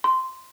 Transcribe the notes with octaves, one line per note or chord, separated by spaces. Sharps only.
C6